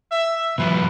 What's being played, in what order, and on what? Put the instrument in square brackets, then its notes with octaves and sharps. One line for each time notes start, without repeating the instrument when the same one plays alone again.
[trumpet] E5
[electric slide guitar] A#2 F3 G3 [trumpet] B4